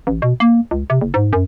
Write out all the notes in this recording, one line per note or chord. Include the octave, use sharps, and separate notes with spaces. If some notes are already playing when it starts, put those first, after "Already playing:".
A1
B2
A#3
C#2
C3
F#1
G#2
F#2